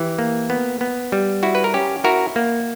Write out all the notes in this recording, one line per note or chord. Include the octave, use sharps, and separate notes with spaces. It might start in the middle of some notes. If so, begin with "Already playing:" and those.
Already playing: E3 G4
A#3
B3
B3
G3
E4 F#4
B4
A#4
C#4 G4
E4 F#4 A#4
A#3